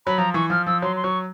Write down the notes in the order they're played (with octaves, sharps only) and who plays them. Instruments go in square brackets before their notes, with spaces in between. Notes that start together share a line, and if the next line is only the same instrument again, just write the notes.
[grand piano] F#3 [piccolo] B5
[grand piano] F3 [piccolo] A#5
[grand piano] E3 [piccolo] C#6
[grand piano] F3 [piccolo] F6
[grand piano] F3 [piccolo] E6
[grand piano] F#3 [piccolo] C6
[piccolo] C6
[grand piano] F#3 [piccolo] C#6